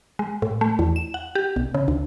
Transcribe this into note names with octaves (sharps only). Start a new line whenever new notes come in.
G#3
A2
A3
E2
E7
F#5
G4
B1
C#3
D2